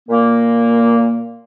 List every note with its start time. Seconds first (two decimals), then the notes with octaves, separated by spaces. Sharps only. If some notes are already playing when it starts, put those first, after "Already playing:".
0.09 A#2 A#3